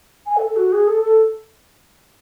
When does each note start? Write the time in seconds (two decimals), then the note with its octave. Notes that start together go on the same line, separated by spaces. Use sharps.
0.26 G#5
0.37 A4
0.47 A4
0.56 F#4
0.72 G#4
0.87 A4
1.01 A4